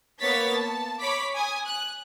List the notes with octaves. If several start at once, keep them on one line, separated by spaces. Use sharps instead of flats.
A#3 B3 C#5 A6 B6
A5
C#5 B5 D6 B6
G#5 D#6
F#6